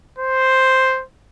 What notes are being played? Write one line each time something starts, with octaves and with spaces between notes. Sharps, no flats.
C5